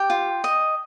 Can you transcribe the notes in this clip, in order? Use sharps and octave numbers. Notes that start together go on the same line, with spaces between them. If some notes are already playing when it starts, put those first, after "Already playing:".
Already playing: G4 G5
F4
D#5